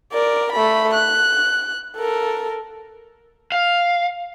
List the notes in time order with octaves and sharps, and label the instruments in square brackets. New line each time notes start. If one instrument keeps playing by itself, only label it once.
[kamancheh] A#4 D5
A3 B5
F#6
A4 A#4
[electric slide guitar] F5